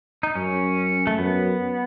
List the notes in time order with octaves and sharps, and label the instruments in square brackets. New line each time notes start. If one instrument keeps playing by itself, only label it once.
[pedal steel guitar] D#4
[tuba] F#2 [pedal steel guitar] C#4
[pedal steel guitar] A3
[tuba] F#2 [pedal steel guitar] B3